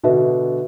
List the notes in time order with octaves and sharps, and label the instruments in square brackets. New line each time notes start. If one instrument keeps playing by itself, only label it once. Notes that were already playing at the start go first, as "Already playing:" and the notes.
[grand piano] B2 D3 [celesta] F#4 B4 E5